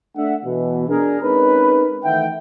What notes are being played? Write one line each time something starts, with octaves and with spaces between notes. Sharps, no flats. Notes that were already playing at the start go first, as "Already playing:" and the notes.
A3 D4 E5 F#5
B2 E3
D4 G#4 A#4
G#3 C4 C#4 D#4 A#4 B4
D#3 E3 A3 E5 F#5 G5